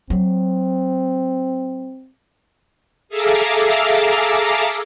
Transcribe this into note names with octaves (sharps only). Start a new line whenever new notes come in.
F#3 C4
G#4 A4 E5 F5 A#5 D6